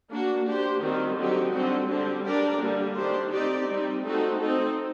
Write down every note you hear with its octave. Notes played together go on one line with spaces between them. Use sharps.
A#3 D4 F#4
D4 G4 C5
D#3 G3 C4 F#4
D3 F#3 C4 D#4 G4
D3 G3 C4 F#4
D3 G3 C4 G4
G3 D4 G4 A#4 D5
D3 G3 A#3
D#3 A3 D4 G4 C5
C4 D#4 G4 D5
G3 C4 D#4
A3 C4 D#4 F#4 A4
C4 D#4 A4